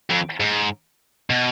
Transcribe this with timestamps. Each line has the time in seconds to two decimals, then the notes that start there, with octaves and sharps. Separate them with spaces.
0.10 F2
0.40 G#2
1.30 B2